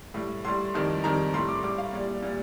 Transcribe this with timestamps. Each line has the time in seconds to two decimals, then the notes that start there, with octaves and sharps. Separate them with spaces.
0.14 A2 G3
0.45 A2 G3 C6
0.74 F2 D#3 G3
1.04 F2 D#3 G3 A#5
1.34 A2 G3 C6
1.49 D6
1.63 A2 G3 D6
1.78 F5
1.93 A#2 G3
2.23 A#2 G3